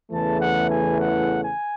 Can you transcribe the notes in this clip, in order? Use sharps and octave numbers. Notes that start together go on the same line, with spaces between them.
E2 C#3 E3 A3 A5
F#5
G#5
F#5
G#5